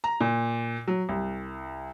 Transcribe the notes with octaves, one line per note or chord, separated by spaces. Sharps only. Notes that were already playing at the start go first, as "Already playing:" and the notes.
A#5
A#2
F#3
C2